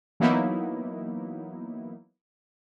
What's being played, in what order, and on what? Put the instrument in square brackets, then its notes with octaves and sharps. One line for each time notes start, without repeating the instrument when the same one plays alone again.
[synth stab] E3 F#3 A#3 B3 D#4 E4